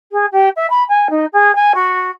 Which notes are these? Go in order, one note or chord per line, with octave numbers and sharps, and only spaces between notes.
G#4
G4
E5
B5
G#5
D#4
G#4
G#5
F#4